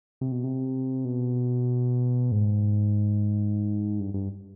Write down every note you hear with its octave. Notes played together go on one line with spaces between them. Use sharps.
C3
B2
C3
B2
G#2
G2
G2